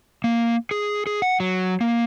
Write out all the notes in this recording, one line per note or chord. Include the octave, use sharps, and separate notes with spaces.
A#3
G#4
G#4
F#5
F#3
A#3